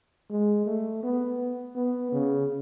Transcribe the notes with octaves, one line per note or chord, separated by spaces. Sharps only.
G#3
A3
B3
B3
C#3